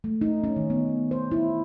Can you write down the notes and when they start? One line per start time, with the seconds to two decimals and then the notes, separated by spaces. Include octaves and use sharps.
0.04 A3
0.21 D#4
0.44 C#4
0.56 D#3
0.70 B3
1.11 C5
1.32 E4